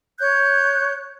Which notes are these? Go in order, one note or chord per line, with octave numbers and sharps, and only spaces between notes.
C#5 F#6 G6